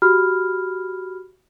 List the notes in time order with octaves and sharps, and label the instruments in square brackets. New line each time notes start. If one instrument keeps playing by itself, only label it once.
[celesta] F#4 G4 B5 F6